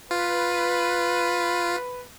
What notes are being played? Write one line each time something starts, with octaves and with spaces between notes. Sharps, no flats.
F4 B4